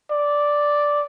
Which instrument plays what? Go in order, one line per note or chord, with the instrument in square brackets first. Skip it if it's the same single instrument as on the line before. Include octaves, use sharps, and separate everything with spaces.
[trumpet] D5